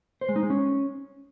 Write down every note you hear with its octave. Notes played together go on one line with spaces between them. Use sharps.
C5
G#3
D#4
G#3
C#4